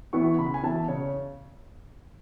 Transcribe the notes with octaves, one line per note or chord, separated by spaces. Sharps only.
E3 B3 E4 C#6
C#3 B5
G#5
E3 B3 E4 A5
C#3 C#5